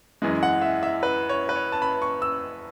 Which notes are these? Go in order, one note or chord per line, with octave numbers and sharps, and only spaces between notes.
F#2 E3 G#3
F#5
E5
E5
B4
C#5
B4
C#5
A5
B5
C#6
E6